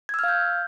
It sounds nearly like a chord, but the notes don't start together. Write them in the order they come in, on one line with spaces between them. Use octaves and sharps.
G#6 E6 F6 F5 G6